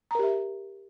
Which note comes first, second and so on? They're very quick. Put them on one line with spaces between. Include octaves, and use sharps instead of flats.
A#5 A#4 G4 E5